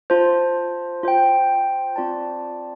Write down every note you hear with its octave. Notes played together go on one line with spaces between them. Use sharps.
F4 C5 A5
F4 C5 G5
C4 F4 D5 A5